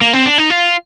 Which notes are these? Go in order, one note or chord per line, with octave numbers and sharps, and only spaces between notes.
A#3
C4
D4
D#4
F4